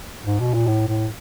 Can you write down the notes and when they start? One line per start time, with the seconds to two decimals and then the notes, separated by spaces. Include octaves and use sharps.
0.26 G#2
0.40 B2
0.54 A#2
0.67 A2
0.88 A2